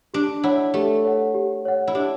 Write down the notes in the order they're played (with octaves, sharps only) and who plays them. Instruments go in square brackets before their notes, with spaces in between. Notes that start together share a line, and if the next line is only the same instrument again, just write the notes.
[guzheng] D4 [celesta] G4
[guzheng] E4 [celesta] C#5 F#5
[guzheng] A3 [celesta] G4
[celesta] C#5 F#5
G4
C#5 F#5
[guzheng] E4
[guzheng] D4 [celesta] G4